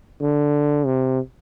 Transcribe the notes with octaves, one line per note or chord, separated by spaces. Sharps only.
D3
C3